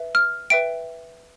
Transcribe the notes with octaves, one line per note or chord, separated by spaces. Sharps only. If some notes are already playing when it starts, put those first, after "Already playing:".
Already playing: B4 E5
F6
B4 E5 G5 D7